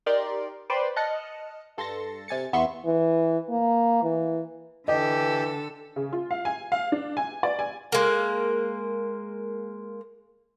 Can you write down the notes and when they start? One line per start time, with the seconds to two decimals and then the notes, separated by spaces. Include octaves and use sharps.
0.06 D#4 G4 A#4 D5 C6
0.70 B4 C5 D5 G5 C6
0.96 D#5 A5 F6 F#6 C#7
1.77 G2 A4 C6 A6 A#6 C#7
2.28 C3 G#5 A6 C#7
2.53 E2 B3 E5 C6 C#6 C#7
2.85 E3
3.50 A#3
4.03 E3
4.88 D3 E3 G4 A4 D#5
5.96 C#3
6.13 F4
6.31 F5
6.45 G#5
6.72 F5
6.92 D4
7.17 G#5
7.43 D5
7.59 G#5
7.92 G#3 A#3